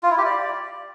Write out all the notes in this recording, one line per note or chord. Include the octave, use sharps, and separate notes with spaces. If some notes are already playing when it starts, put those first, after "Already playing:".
F4
E4
G4
D5